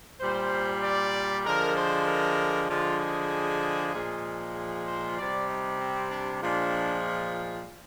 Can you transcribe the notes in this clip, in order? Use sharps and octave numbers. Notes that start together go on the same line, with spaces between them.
A#2 G3 C5
D5
D3 F3 G#3 A#4
C5
A#4
D3 F3 G#3 F4
G#4
A#2 F3 G#3
G#4
C5
C3 G3 D5
D#4
C4
D4
A#2 F3 G#3 D4